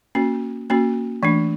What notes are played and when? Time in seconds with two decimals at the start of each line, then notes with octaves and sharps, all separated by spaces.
0.15 A#3 C#4 F#4
0.70 A#3 C#4 F#4
1.23 E3 A3 D4